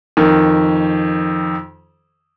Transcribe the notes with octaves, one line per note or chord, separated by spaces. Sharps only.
F2 D#3